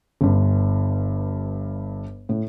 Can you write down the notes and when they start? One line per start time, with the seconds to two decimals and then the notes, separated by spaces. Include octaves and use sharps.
0.21 G1 G2
2.29 A2